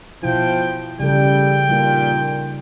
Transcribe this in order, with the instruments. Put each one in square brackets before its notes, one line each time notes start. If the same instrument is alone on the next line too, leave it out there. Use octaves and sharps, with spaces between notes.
[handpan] B2 E4 [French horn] F3 [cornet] G5
[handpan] C#3 F3 A4 [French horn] G3 [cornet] G5
[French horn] A#2 [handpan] G3 D#4 F4